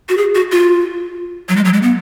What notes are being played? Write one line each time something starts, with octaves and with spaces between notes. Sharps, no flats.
F#4
G#4
F#4
F4
F#3
G#3
F#3
G#3
B3